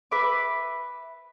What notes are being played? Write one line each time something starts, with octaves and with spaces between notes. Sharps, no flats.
B4 E5 D6